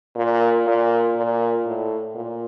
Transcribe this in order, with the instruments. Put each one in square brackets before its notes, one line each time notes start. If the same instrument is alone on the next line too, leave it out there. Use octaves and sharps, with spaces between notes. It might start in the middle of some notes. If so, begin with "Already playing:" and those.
[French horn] A#2
A#2
A#2
A2
A#2